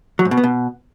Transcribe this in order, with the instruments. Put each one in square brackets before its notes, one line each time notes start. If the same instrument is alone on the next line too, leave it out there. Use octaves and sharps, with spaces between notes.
[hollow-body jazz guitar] F#3
G#2
B2
B3
B2